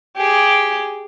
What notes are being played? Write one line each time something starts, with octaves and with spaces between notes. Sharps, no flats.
G4 G#4